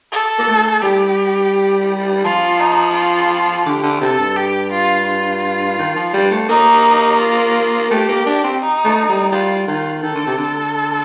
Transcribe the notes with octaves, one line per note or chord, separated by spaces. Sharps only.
A4
A#3
A3
G3 G4
F3 F4
D#4
F4
D3 G4
D3
C3 A4
G2
G4
F4
F4
D#3
F3
G3
A3
A#3 D#4
F4
A3 G4
A#3
D4
C4
D#4
A3
G3
G3 F4
D#3 F4
D#3 A4
D3
C3
D3